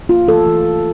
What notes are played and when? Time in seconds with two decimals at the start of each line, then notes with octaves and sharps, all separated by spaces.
0.09 A#3 F4
0.28 E3 A4
0.47 E3
0.65 E3